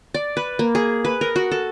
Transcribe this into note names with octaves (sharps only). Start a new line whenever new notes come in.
D5
B4
A#3
G#4
B4
A#4
F#4
A4